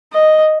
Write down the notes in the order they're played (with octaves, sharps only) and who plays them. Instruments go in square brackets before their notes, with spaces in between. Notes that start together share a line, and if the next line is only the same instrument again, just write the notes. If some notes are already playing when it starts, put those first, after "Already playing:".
[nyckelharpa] D#5